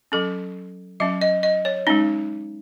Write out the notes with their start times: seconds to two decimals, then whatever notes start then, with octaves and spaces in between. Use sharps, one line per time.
0.12 F#3 C#4 A4
1.00 F#3 C#4 E5
1.21 D#5
1.43 D#5
1.65 C#5
1.87 G#3 C#4 D#4